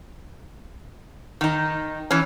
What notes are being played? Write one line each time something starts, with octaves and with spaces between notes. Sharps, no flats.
D#3 D#4
E3 C#4